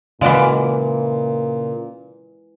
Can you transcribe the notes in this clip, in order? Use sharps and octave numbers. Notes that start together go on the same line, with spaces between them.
A#2 C#3 E3 G#3 F#4 D5 F5